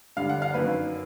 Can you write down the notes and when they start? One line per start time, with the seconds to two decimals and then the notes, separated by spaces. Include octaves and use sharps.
0.16 G2 D3 G3 F5
0.29 F#5
0.42 F5
0.54 F#2 D#3 F#3 A#3 B4